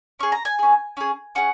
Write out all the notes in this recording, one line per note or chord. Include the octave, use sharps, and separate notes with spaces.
C#4 G#4 C#6
A#5
G#5
C#4 G#4
C#4 G#4
C#4 G#4 F#5